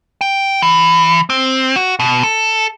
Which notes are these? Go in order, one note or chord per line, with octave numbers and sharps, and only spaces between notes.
G5
E3
C4
F#4
B2
A4